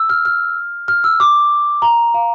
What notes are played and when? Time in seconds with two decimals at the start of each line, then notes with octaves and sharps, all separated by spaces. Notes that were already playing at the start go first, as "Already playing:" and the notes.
Already playing: E6
0.10 F6
0.25 F6
0.88 F6
1.04 E6
1.20 D6
1.82 A#5
2.14 F5